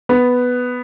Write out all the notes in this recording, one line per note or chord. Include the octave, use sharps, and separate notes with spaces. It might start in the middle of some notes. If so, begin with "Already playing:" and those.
B3